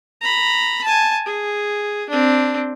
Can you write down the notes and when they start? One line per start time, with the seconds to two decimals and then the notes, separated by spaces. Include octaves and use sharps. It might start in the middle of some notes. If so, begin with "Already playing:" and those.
0.21 A#5 B5
0.84 G#5 A5
1.26 G#4
2.09 C4 D4